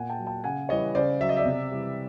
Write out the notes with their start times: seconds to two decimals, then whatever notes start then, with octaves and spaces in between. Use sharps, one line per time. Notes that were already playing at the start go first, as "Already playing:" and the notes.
Already playing: A#2 F#5 G#5
0.10 G5 A5
0.19 F#3
0.27 G5 A5
0.44 C#3 F#5 G#5
0.69 E3 G3 C#5 D#5
0.95 C#3 C5 D5
1.21 F#3 E5
1.29 D#5
1.37 D5 E5
1.45 C3
1.72 E3 G3